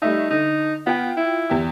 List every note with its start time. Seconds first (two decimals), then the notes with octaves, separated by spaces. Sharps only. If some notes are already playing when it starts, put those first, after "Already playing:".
0.02 G3 A3 D#4 E5
0.31 D3 D#4
0.87 B3 F4 G5
1.17 E4
1.50 E2 G4